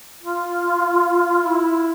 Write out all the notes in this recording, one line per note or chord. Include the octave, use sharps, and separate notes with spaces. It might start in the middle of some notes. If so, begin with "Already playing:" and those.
F4
E4